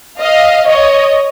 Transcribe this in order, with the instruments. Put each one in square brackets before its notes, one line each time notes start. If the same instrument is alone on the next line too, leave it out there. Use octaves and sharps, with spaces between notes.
[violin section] D#5 F5
C#5 D#5